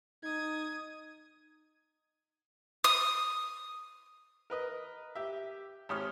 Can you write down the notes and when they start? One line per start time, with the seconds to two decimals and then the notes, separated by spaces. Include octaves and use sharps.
0.23 D#4 D#6 G#6
2.84 D#6
4.50 A#4 B4 D#5
5.15 G4 E5
5.89 G#1 G4 C#5 D#6 F6